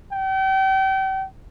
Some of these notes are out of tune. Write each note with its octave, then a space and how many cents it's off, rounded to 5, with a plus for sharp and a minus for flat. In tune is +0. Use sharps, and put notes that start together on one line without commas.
G5 -35